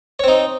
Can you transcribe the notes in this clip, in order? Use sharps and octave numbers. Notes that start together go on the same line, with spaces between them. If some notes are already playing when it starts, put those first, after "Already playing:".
C4 D#4 C#5